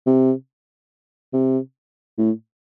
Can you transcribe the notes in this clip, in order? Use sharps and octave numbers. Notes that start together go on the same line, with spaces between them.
C3
C3
A2